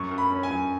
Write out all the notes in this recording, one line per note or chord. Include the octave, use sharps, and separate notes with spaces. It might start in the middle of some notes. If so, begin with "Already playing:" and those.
Already playing: F#2 C#6
F#2
B5
C#4
G#5
F#2